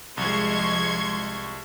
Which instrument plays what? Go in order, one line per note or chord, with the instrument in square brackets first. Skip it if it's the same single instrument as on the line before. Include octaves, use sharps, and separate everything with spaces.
[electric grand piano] C2 [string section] F3 G#3 [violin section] C6 C#6 G#6